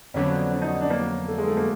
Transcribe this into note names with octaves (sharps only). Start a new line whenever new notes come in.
F2 D3 F#3 B3 C#4
D4
D#4
D4
A#3
A3
G#3
A3
A#3